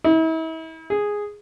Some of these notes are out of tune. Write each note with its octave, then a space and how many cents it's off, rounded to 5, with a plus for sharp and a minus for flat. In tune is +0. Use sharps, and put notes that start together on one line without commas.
E4 -40
G#4 -5